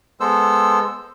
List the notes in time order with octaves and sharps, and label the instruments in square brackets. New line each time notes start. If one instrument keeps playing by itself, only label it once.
[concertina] G#3 B3 A4 C5 E6